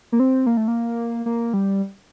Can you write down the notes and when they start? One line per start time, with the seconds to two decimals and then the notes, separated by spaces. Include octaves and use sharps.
0.12 A#3
0.20 C4
0.46 A#3
0.57 A3
0.68 A#3
1.26 A#3
1.54 G3